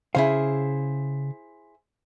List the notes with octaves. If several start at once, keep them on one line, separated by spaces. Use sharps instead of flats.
C#3 E4 G#4 C5 F5